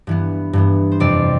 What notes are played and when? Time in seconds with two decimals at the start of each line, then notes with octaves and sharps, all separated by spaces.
0.07 G2 E3 B3
0.53 G2 E3 B3
0.92 C5
1.00 F2 C3 G3 D5